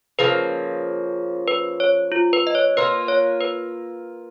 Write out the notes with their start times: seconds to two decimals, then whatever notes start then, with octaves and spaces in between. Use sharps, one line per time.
0.19 C#3 F3 A#3 B4
1.48 B4
1.80 C#5
2.12 F4
2.33 B4
2.47 D#5
2.55 C#5
2.77 A#3 F4 A#4 B4
3.08 C#5
3.41 B4